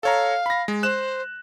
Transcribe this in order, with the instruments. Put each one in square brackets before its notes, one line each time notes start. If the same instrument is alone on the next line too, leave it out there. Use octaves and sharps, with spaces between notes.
[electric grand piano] A4 C#5 A#5 [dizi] F5
[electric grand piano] B5 A#6
G#3
[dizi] C5 [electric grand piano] F#6 E7